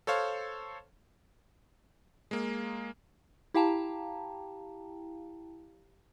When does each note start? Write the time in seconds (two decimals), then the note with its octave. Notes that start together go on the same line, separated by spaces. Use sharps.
0.07 A4 C5 C#5 F5
2.31 G#3 A#3
3.54 E4 G4 F5 G5 A5 A#5